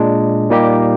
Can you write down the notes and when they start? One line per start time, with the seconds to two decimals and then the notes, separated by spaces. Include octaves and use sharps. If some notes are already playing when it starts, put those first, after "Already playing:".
Already playing: A#2 G#3 D4
0.50 A#2 G3 A#3 D#4 G4